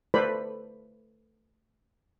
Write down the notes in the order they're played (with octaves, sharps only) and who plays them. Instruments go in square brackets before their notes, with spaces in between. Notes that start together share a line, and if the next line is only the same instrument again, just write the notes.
[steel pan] A3 A4 B4 C5 D5 B5